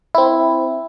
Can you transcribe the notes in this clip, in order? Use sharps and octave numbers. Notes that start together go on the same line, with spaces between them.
C4 E4